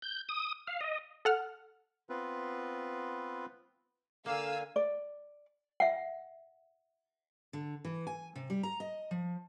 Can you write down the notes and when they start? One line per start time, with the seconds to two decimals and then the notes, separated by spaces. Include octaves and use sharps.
0.02 G6
0.29 D#6
0.67 F5
0.81 D#5
1.25 A4 F#5 F6
2.09 B3 C4 F4 B4
4.26 D3 A#3 F5 G#5 E6
4.76 D5
5.80 E5 F#5
7.53 D3
7.85 E3
8.07 G#5
8.36 C3
8.50 G3
8.63 A#5
8.80 D#5
9.11 F3